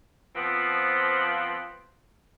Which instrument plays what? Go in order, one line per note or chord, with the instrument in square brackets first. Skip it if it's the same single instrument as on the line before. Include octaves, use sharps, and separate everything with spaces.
[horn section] F3 B3 C4 F4 C5